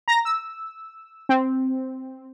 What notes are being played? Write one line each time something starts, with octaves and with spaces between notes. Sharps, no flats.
A#5 A#6
E6
C4